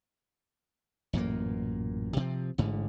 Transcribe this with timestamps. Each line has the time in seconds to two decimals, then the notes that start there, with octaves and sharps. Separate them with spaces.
1.13 A1 F#2 A#2 A#3
2.17 C3 F3 C4
2.58 A1 G#2 D3